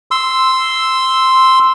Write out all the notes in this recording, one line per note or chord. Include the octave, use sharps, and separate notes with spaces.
C6 E6